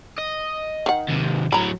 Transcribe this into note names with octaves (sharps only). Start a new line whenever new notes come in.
D#5
D#3 F#5
D#2 C3
A2 F#3 A#5 B5